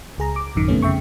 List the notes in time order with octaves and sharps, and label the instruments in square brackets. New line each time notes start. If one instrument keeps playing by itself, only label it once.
[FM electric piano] C#2 G#4 A#5
D6
A1 F#2 D#3
F2 C3 G3 A3 B3 C#4
F2 C#3 E5 G5 C#6